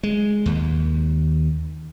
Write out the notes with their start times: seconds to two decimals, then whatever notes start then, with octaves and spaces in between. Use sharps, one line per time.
0.03 G#3
0.46 D#2